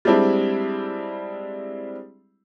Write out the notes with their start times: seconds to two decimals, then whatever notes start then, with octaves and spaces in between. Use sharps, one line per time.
0.05 G3 G#3 C4 D4 E4